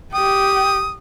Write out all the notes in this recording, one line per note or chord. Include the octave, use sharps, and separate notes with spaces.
G4 G5 D#6